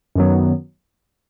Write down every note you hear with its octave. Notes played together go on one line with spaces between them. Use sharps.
F#2 D#3 F#3 B3